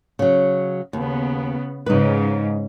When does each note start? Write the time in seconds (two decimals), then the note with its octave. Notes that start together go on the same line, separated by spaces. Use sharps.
0.19 C#3 F#3
0.93 D#2 C#3 B3
1.86 G#2 C#3 D#4 B4